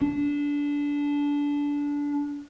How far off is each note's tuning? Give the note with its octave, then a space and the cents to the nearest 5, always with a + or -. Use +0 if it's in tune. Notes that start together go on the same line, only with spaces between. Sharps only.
D4 -20